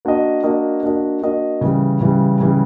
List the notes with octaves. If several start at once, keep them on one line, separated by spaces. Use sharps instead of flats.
A#3 D4 F#4 A#4 D#5
A#3 D4 F#4 A#4 D#5
A#3 D4 F#4 A#4 D#5
A#3 D4 F#4 A#4 D#5
C#3 E3 G3
C#3 E3 G3
C#3 E3 G3